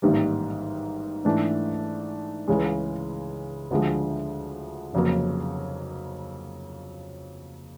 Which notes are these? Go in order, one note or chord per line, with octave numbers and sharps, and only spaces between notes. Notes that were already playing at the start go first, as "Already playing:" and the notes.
A1 G#2 D#3 G3 A#3
G#2 E3 A3 D4
C#2 C#3 E3 G#3
D2 D3 F3 G#3
F1 F2 C#3 F#3 A#3